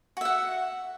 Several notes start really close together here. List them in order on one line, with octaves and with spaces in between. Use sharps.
F#4 E5 F#5